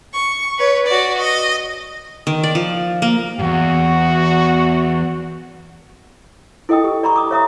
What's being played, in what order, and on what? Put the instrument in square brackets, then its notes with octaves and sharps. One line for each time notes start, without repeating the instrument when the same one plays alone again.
[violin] C#6
B4 C#5
F#4 D5
D#5
[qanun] D#3
D5
F3
A#3
[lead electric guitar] E2 G2 [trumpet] F#4
[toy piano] E4 A4 D#5 G5 D#6
G4
D5 A#5 B5 C#6
D6 D#6
C#5 E5 A#5 D#6